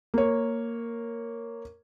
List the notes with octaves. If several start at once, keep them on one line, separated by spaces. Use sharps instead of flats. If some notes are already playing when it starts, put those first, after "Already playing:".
A#3 C#5